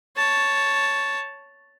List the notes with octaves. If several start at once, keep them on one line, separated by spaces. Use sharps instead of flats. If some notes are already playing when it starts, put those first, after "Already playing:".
C#5 A5